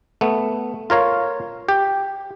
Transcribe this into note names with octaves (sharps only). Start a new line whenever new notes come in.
A3 B3
F4 A#4 C#5 F5
G4